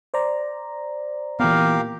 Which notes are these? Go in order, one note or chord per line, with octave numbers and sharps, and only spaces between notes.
C5 D5 A#5
A#2 E3 B3 G4 A#4 F5